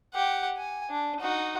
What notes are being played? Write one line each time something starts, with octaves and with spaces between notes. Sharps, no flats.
G4 F#5
G#5
D4
D#4 F#4